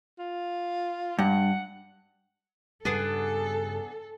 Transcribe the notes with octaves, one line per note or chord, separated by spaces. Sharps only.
F4
G2 F#5
G2 C#3 G3 B3 D4 G#4 A4